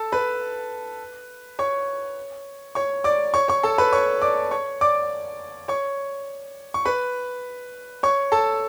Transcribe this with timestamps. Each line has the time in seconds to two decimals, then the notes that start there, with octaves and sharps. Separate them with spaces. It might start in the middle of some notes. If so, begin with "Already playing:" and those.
Already playing: A4 A5
0.12 B4 B5
1.59 C#5 C#6
2.75 C#5 C#6
3.04 D5 D6
3.34 C#5 C#6
3.48 C#5 C#6
3.63 A4 A5
3.78 B4 B5
3.92 C#5 C#6
4.22 D5 D6
4.51 C#5 C#6
4.81 D5 D6
5.68 C#5 C#6
6.74 C#6
6.85 B4 B5
8.03 C#5 C#6
8.32 A4 A5